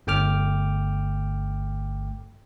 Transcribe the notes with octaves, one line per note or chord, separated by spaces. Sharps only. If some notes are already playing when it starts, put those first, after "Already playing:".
G1 A3 G5 D6 F6